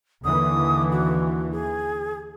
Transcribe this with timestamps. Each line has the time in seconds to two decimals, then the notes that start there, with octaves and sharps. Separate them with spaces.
0.24 D#2 D3 E3 D#6
0.92 F#4
1.52 G#4